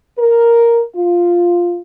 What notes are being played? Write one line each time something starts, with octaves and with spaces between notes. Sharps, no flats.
A#4
F4